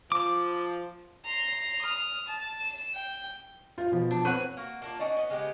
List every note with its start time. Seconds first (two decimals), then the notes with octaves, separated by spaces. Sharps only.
0.12 F3 D6
1.25 A#5 C6
1.82 D#6 F6
2.28 A5
2.61 E7
2.95 G5
3.78 F4 F5
3.92 B2 F3
4.11 D4
4.25 C4 B4 C#5 F#5
4.57 A#3 F#4
4.82 A#3 D4 F4
4.99 C#4 D#4 F#4 D5
5.17 B3 D#5
5.30 C#3 G#3 B3 G4